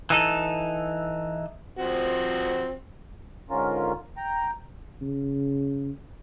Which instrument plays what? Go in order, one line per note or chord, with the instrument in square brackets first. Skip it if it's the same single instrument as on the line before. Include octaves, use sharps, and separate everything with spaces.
[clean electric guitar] E3 D#4 A4
[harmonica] F3 C4 F#4
[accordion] G#2 D3 C#4 F4 A#4
G5 A#5
[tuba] C#3